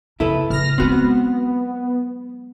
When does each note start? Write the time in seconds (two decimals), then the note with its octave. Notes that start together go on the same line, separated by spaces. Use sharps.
0.20 F#2 C#3 E4 A4 B4
0.50 C#3 F6 A#6
0.78 F#3 G#3 B3 C4 F#4